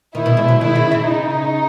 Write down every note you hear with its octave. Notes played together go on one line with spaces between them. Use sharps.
D#3 E4
B2
G#3
F#3
D#3 E4
C#3
C#3
D#4